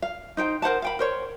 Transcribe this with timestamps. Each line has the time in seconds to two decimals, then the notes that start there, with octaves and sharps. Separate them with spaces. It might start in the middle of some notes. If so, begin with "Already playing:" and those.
0.02 F5
0.37 D#4 C5 G5
0.62 A#4 C5 F#5 A5
0.82 F5 G5 B5
0.99 A#4 C5 C#5